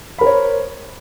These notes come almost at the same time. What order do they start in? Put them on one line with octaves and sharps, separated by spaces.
B5 A#4 C5 C#5